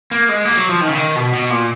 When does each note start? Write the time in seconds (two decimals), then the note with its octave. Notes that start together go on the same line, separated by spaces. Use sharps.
0.11 A#3
0.29 G#3
0.45 A#3
0.57 F#3
0.69 F3
0.81 D#3
0.88 C#3
0.95 D#3
1.16 B2
1.33 B2
1.50 A#2